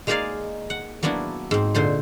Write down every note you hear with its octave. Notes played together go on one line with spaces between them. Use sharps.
G#3 A#3 D#4 G#4 D5 F5
F#5
F#3 A#3 B3 D4 E4
G#2 C4
A#2 D3 C5 C6